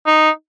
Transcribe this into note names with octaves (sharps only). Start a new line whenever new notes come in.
D#4